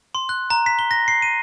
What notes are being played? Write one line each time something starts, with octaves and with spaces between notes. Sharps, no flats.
C6
F#6
A#5
B6
G7
A#6
C7
D#7